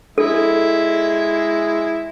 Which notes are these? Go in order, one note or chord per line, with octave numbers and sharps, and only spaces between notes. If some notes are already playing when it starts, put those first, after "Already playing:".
G#3 E4 A4